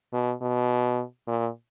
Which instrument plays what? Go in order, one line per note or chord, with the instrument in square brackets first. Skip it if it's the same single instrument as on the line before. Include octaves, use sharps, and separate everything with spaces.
[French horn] B2
B2
A#2